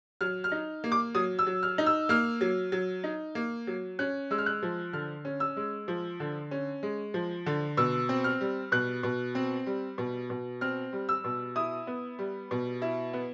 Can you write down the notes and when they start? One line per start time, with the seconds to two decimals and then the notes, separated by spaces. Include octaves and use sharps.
0.21 F#3 F6
0.44 F6
0.52 D#4
0.84 A#3
0.92 D6
1.15 F#3 D#6
1.39 E6
1.47 F#3
1.63 F6
1.78 D#4
1.86 E6
2.09 A#3 F6
2.41 F#3
2.72 F#3
3.04 D#4
3.35 A#3
3.67 F#3
3.99 C#4 F#6
4.31 G#3 E6
4.38 F6
4.46 F#6
4.63 F3
4.93 D3 F6
5.25 C#4
5.40 E6
5.56 G#3
5.88 F3
6.20 D3
6.51 C#4
6.83 G#3
7.14 F3
7.46 D3
7.77 B2 E6
8.09 C4
8.24 F6
8.41 G3
8.72 B2 F#6
9.03 B2
9.35 C4
9.66 G3
9.98 B2
10.30 B2
10.61 C4 F6
10.93 G3
11.09 E6
11.24 B2
11.56 E4 D#6
11.87 B3
12.19 G3
12.51 B2
12.82 E4
13.13 B3